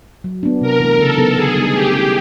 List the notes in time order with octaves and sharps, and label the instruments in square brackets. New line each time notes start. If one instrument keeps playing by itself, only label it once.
[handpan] F#3
B3 D4
[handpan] C3 [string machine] A#4
[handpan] E3 A3
[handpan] C#3 [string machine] A4
[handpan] F#3 B3 D#4 G4
[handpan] D3 [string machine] G#4
[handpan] G3 B3 D#4
[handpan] A3 [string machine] G4
[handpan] C#4 E4